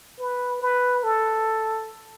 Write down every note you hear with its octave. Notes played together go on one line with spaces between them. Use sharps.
B4
B4
A4